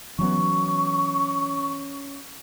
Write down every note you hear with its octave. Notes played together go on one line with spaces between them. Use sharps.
E3 F#3 B3 C#4 C#6